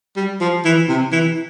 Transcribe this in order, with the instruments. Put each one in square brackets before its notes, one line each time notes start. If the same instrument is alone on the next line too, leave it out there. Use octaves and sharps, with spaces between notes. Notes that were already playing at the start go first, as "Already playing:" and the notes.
[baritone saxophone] G3
F3
E3
C3
E3